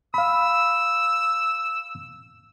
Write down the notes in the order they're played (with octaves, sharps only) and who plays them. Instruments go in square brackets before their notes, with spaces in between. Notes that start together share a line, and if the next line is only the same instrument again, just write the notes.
[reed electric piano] F5 B5 [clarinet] E6